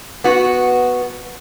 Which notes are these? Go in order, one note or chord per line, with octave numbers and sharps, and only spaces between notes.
B3 F#4